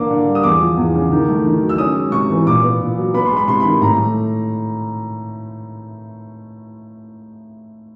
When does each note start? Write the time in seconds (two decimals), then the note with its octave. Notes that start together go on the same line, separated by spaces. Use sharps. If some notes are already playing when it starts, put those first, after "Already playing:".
Already playing: D3 A#3 D6
0.10 D3
0.27 G3
0.35 D#6
0.43 E2 D6
0.60 F3
0.77 E2
0.95 C#3
1.12 D#3
1.29 A3
1.45 D#3
1.61 F#3
1.69 E6
1.78 C#4 D#6
1.96 G#3
2.12 C3 C#6
2.30 E3
2.47 A#2 D6
2.63 B3
2.81 A#2
2.98 F#3
3.14 B3 B5
3.26 G#3 C6
3.37 B5
3.48 C3 C6
3.60 B5
3.65 D#3
3.81 A2 A#5
3.98 A3